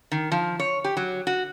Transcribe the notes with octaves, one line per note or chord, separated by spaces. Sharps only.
D#3
F3
C#5
G4
F#3
F#4